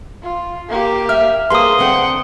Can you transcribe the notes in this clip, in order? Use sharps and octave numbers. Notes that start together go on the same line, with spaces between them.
F4
A#3 G4
E5 F6
A#3 G#4 B4 C5 C6 D#6
D3 C4 F#5 G5